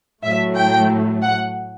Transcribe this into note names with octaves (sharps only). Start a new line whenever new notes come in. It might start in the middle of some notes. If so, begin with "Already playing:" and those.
A2 F#3 A3 E5
G5
F#5